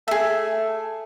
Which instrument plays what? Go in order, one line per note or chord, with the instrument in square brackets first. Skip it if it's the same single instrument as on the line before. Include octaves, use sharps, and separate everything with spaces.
[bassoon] A3 [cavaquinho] G#4 E5